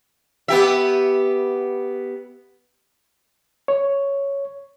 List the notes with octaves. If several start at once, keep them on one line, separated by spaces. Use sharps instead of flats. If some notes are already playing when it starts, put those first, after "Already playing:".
B3 G4 E5
C#5